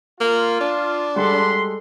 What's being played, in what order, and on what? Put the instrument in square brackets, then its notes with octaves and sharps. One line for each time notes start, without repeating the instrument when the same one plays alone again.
[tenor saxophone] A#3 [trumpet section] F4
[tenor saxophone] D4
[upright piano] G3 G#3 A4 [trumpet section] F#5 B5 C6